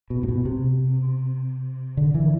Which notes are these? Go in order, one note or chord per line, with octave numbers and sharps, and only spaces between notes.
B2
A2
B2
C3
D3
E3